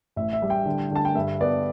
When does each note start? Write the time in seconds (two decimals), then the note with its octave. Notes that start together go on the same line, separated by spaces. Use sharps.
0.16 A1 E5
0.33 E5
0.42 G3
0.50 G5
0.66 D3
0.91 D3 A5
1.05 G5
1.15 G2 E5
1.41 B3 D5